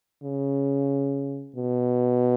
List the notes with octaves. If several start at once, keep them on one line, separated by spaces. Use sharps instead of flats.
C#3
B2